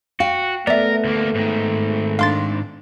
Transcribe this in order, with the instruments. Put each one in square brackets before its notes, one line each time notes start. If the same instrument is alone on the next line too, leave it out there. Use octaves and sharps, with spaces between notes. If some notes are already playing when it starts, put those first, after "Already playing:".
[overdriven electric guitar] F#4 [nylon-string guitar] F5 G5
[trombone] A3 [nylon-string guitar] B3 [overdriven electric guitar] A#4 [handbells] D5 E5
[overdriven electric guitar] D2 A#3
G#2 D#3
[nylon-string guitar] D4 [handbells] F5 C6 A6